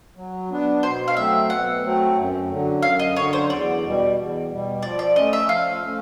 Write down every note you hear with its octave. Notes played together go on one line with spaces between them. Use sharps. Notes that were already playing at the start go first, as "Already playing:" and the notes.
F#3
B3 D4
B2 C5
F5
F#3 A3 C4 E5
B2 F#5
F#3 A3 C4
F#2
D3 F#3
F#2 F5
D#5
D3 F#3 C#5
C5
E2 D5
B2 G3
E2
B2 G3
F3 D5
D5
A3 C#4 D#5
E5
F3 F5
A3 C#4